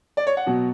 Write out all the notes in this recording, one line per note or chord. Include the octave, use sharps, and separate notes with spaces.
D5
C#5
F#5
B2 F#3